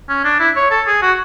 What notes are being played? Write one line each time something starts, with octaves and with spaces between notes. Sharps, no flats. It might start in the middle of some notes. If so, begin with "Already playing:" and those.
C#4
D4
E4
C#5
A4
G#4
F#4